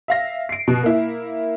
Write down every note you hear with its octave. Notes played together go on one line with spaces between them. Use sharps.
E5 F5 A#6
C7 D7
B2
A#3 E4